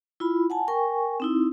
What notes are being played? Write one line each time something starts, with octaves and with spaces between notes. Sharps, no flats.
E4 F4 B5
F#5 G#5 A5
A#4 G5 G#5 C#6
C4 D#4 E4